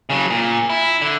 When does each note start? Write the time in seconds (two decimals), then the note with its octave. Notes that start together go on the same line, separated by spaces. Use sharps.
0.10 C#3 F#3
0.30 A#2
0.70 E4
1.01 D3